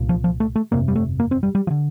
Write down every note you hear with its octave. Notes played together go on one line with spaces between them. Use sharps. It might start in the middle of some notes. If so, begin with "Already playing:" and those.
Already playing: C2 A#2
F3
F3
A3
A3
G1 F2 C3 A#3
G3
A3
A#3
C4
G3
G3
F3
D3